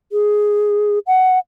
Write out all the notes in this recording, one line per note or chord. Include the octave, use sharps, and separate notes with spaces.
G#4
F#5